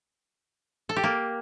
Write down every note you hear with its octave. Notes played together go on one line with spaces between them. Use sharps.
A4
G4
A#3